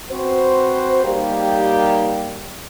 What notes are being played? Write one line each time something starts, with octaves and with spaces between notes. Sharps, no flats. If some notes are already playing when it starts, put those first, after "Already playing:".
C4 F#4 B4 C5
G3 A#3 D#4 G4